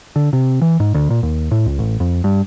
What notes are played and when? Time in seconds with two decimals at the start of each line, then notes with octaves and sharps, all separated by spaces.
0.16 D3
0.33 C3
0.62 E3
0.80 G#2
0.94 D2
1.10 A#2
1.23 D#2
1.51 A2
1.66 C#2
1.79 A1
2.00 F2
2.24 G2